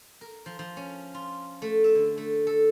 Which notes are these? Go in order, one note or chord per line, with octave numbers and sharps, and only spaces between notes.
A#4
F3
F3
C#4
F4
A3
E5
D3
A3
A4